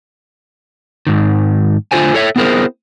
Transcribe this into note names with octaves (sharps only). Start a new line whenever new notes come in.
G#2 D#3
D3 A3 F4 A4 C5 G#5
A4 C#5 E5
B3 C4 E4 G#4 A#4 C5